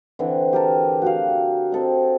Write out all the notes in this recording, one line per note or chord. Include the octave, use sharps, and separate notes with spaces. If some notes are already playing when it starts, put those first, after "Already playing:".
D3 E3 C4
G4 A#4 A5
F#4 G4 F5
C4 A4 D#5